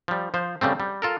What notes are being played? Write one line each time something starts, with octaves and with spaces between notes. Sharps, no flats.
F3 G3
F3 C5
C#3 G3 A3 C4
G3
F4 A4 A#4